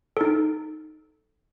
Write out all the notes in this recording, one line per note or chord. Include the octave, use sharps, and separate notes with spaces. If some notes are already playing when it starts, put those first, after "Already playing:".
D#4 A4